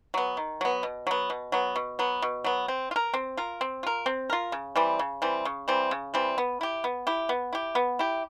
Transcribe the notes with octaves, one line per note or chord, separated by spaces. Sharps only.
F#3 B3
D#3
F#3 B3
B2
F#3 B3
B2
F#3 B3
B2
F#3 B3
B2
F#3 B3
C4
F4
A#4
C4
F4 A#4
C4
F4 A#4
C4
F4 A#4
C#3
E3 G3 C4
C#3
E3 G3 C4
C#3
E3 G3 C4
C#3
E3 G3 C4
B3
E4 G4
B3
E4 G4
B3
E4 G4
B3
E4 G4